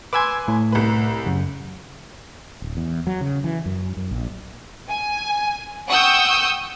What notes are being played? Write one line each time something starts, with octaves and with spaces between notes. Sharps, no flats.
B4 G#5 C6 D6 E6 G#6
A2
C2 B4
F#2 C#3
D1
E2
F#3
C#3
E3
F#2
F#2
A#1
G#5
F#5 G5 C#6 D#6 E6 G6